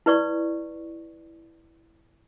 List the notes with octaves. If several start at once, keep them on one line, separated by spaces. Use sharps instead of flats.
E4 B4 D5 C#6